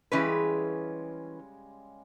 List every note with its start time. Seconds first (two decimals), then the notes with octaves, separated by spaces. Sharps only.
0.12 C#3 E3 G3 G#3 C#4 B4